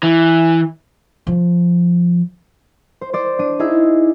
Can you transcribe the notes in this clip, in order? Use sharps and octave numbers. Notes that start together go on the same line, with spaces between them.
E3
F3
C5
C5 D5
D4 D#7
D#4 E4 G#4 E5